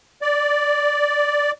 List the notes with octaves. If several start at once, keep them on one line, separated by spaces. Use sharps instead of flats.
D5